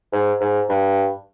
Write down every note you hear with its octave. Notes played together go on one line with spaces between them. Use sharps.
G#2
G#2
G2